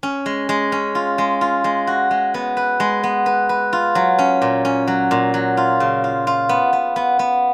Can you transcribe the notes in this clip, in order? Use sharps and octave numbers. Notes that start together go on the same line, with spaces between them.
C#4
G#3
G#3
C#4
F4
G#3
F4
G#3
F#4
G#3
B3
B4
G#3
B3
B4
B4
F4
F#3
C#4
A#2
C#4
F#3
A#2
F#3
F4
C#3
F4
F4
B3
B3
B3
B3